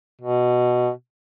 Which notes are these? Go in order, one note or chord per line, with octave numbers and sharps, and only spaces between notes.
B2